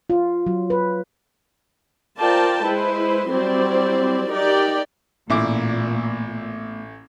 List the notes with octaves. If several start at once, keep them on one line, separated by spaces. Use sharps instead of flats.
F4
F#3
B4
F4 A#4 C5 D5 G5 A5
G#3 E4 B4 C5
F#3 G3 C4 E4 C5 D5
D#4 G4 A#4 D5 G5
A1 A#2 A3 B3 E4 D6